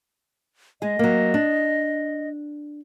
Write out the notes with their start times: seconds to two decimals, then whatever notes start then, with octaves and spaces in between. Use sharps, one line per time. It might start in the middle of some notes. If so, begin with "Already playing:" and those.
0.82 G#3 G#4 D#5
0.99 F#3 A#3
1.34 D4